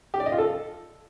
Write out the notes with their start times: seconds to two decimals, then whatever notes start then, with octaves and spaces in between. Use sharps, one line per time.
0.14 G4
0.20 D5
0.26 D#5
0.32 F4
0.38 A4